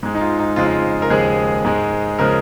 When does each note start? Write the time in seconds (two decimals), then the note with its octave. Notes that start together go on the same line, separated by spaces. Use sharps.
0.03 G#2 G#3
0.15 D#4
0.21 F4
0.39 D#4
0.56 F2 C#3 G#3 F4
0.65 D#4
0.73 F4
1.02 A#4
1.10 D#2 C#3 F3 G#3 G#4
1.65 G#2 G#3
2.19 C#3 F3 G#3 A#4